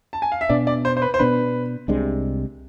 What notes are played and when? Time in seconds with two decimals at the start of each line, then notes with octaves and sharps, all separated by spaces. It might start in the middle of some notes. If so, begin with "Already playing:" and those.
0.13 A5
0.22 G#5
0.32 F5
0.41 E5
0.49 B2 B3 D4 D5
0.67 D5
0.85 C5
0.97 C5
1.02 B4
1.14 C5
1.19 B2 B3 D4 B4
1.88 C2 C3 G#3 D4